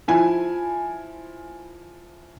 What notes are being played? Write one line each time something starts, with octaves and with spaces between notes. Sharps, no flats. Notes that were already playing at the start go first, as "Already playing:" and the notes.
F3 E4 G#5